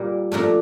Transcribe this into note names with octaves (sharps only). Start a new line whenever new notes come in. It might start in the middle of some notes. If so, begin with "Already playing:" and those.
Already playing: A#2 G3 A#3
A#2 F3 A3 D4 A#5